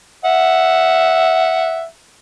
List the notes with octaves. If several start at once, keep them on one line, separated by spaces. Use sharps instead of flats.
E5 F#5